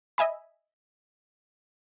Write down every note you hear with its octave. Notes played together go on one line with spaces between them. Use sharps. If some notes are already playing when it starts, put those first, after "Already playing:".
D#5 E5 G#5 B5